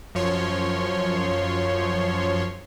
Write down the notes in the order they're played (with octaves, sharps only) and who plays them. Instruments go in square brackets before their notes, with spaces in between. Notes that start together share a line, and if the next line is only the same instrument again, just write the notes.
[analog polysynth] F#2 F3 C#5 C6